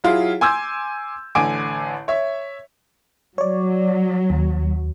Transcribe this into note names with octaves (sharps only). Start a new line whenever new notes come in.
F#3 E4 F4 G#4
G#5 C6 D6 E6 G6 G#6
A1 D3 G#5 D6 D7
C#5 E5
F#3 C#5 D5
D#2